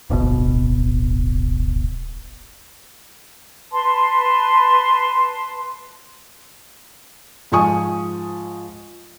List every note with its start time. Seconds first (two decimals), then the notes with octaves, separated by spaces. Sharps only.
0.10 D1 G1 B2
3.72 B4 A5 C6
7.52 G#2 F3 G#5 C#6 D#6